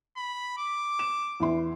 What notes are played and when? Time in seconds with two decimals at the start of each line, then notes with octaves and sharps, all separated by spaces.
0.17 B5
0.58 D6
0.99 E7
1.40 E2 E4 C6